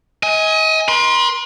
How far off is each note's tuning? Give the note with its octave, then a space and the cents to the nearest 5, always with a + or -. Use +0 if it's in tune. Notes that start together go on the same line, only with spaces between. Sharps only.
D#5 +35 G#5 +0
B4 -45 C6 +0